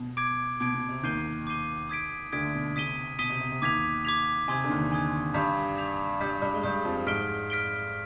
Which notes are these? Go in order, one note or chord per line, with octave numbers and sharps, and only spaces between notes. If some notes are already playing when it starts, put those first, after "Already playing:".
Already playing: B2
D6 G#6 D7
B2 D6 G#6 D7
B2
C3
D#2 D#3 D6 G6 C7 D#7 G7
D6 G6 C7 D#7 G7
D#6 G#6 B6 D7
D2 D3 D#6 G#6 B6 D7
B2
C3 D#6 B6 D#7 G7
B2 D#6 B6 D#7 G7
C3
C3
C3
D#2 D#3 D6 G#6 B6 F7
D6 G#6 B6 F7
C3 G#5 C6 D#6 G#6
D3
D#2 D#3
G#5 C6 D#6 G#6
G2 G3 D6 G6 B6 F7
D6 G6 B6 F7
G2 G3 D#6 G6 B6
G2 G3
G#3
G2 G3 D#6 G6 B6
F2 F3
G#2 G#3 F6 B6 D7 G7
F6 B6 D7 G7